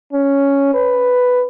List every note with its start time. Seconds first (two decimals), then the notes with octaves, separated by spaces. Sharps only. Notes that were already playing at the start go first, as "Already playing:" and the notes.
0.13 C#4
0.74 B4